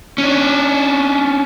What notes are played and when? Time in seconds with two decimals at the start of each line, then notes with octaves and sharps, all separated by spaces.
0.18 C#4 D4